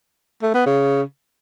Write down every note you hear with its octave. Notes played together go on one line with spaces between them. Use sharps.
A3
B3
C#3